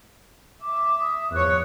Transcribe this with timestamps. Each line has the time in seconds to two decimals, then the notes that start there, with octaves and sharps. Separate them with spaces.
0.62 E5 D6
1.00 D#6
1.32 E2 F3 C#5 F#6